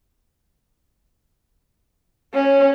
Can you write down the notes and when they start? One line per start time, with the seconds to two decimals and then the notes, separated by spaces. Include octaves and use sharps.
2.34 C#4